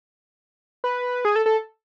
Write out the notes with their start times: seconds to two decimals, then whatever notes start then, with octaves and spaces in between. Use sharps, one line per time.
0.84 B4
1.25 G#4
1.36 A4
1.46 A4